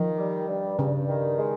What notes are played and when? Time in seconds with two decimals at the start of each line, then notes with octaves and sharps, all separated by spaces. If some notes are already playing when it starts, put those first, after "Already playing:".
Already playing: D#3 F3
0.17 G3
0.48 G2
0.78 G2 C#3
1.08 D#3
1.39 G#3